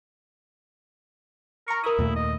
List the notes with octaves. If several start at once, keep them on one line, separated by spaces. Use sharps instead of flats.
A#4 A#5 C#6
E4 A#4 D#6
D#2 A#2 A3
D#5